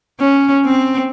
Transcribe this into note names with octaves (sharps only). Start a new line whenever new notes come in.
C#4
C4